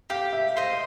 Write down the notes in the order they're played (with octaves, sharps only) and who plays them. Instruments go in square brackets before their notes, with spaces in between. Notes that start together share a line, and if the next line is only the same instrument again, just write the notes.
[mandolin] G4 [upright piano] F5
[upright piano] E5
[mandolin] C5 D#5 [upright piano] F5